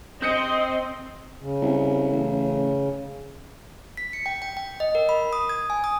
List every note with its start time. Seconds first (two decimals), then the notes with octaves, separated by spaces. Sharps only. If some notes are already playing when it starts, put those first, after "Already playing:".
0.22 C4 D#5 C6 D#6 G6 C#7 D#7
1.42 C#3
1.62 C2
2.11 A1
3.97 B6
4.13 C#7
4.26 G5
4.42 G5
4.57 G5
4.80 D#5
4.95 A#4
5.09 B5
5.33 D#6
5.49 G#6
5.70 G#5
5.84 D#6